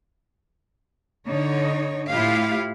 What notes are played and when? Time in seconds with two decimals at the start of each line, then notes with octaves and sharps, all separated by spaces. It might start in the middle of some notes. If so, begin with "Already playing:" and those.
1.29 D3 D#4 C#5
2.12 A2 E4 F4 G4 F5